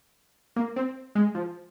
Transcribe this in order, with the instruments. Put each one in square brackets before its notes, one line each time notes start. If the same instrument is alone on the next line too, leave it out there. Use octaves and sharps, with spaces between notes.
[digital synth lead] A#3
C4
G#3
F3